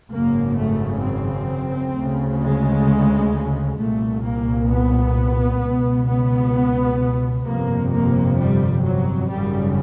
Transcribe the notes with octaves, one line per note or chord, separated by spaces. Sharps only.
G#1 F#2 C#3 A#3
A3
C4
D2 C#3
G#3
C2 A#2 A3
A#3
B3
C#2 B2
B3
G1 F2 C3 A#3
A#3
G3
F#3
G#1 F#2 C#3 G3